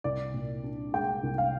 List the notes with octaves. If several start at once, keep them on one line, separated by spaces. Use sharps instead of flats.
C2 D5
A#2
D4
G#3 G5
C2
F5